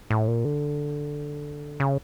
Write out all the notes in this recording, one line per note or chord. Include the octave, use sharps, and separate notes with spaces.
A2
A#2
D3
C#3